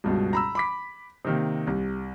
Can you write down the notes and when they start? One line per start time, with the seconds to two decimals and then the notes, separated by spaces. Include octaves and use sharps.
0.04 C#2 G2 B2
0.33 A#5 B5 E6
0.55 B5 D6 B6
1.25 C3 D#3 A#3
1.67 C2